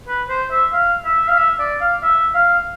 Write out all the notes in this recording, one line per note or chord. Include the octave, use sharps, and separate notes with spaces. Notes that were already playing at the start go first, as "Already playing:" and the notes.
B4
C5
E5
F5
E5
F5
E5
D5
F5
E5
F5